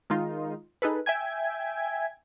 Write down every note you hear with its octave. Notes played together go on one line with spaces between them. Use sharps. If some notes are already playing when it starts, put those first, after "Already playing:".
D#3 G#3 D#4 F4
D#4 G#4 A4 B4
E5 G5 G#5 G#6